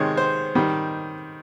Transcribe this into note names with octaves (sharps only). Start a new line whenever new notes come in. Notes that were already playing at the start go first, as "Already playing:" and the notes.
Already playing: C3 D#3 G#3 C#5
C5
D#3 G3